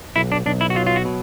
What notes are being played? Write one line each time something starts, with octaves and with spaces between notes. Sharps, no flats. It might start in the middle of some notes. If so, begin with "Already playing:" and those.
B1 E4
D4
B1 D4
E4
F#4
F#3 F4
F4
F#4
B2